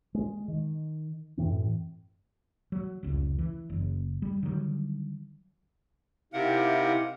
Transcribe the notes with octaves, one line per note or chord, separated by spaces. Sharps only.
G#3
D#3
F#2 A2 E3 C4
F#3
F1 C#2
E3
F#1
G3
D3 D#3 F#3 G3
C3 C4 D#4 E4 G4 A#4 F5 F#5